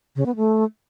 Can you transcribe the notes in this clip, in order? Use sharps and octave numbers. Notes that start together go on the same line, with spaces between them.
C#3
B3
A3